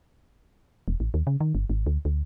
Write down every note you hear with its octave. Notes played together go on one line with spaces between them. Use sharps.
E1
A1
D#2
C#3
D#3
G1
G#1
D2
D2